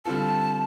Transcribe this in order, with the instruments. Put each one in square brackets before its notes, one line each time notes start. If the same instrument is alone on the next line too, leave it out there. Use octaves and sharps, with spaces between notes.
[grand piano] D3 G3 C4 F4 A4 [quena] A5